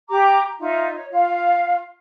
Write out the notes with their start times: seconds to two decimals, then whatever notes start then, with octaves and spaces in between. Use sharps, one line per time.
0.08 G4 A#5 D6
0.59 D#4 F4 E5
0.92 C#5
1.11 F4 F5